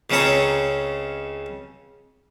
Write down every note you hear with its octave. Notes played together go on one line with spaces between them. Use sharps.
C#2 C#3 C4 C#4 A4 A#5